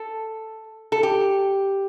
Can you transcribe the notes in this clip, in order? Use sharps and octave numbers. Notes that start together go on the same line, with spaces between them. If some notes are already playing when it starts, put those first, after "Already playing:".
Already playing: A4
A4
G4